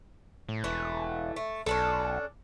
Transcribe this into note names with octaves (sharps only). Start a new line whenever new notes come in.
A2
E1 E3 A3
A3
B1 C#4 D4 A4